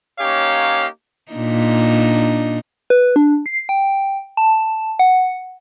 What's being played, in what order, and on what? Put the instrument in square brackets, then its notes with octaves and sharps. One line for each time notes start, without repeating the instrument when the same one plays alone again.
[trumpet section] A#3 C#4 D#4 G4 C#5 F5
[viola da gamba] A#2 D4 D#4
[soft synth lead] B4
D4
C7
G5
A5
F#5